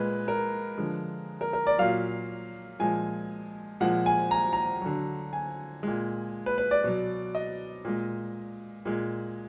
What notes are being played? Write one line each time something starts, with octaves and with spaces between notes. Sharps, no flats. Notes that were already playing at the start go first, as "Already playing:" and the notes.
Already playing: A#2 G#3 B4
A#4
D3 F3 G#3
A#4
A#4
D5
A#2 F#3 F5
A#2 F3 G#3 G#5
A#2 F3 G#3 F#5
G#5
A#5
A#5
D3 F#3
G#5
A#2 G#3
B4
B4
D5
B2 F#3
D#5
A#2 G#3
A#2 G#3